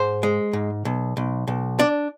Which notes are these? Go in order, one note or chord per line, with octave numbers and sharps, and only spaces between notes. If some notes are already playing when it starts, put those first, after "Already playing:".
Already playing: G#2 C5
G#3
G#2
B1
B1
B1
D4 D5